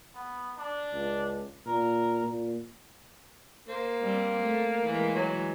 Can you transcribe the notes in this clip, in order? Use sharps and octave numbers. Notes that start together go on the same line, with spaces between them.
B3
D4
C#2
A#2 A#4
A#2
A#3 C5
G3 C4
A3
E3 G#3
F#3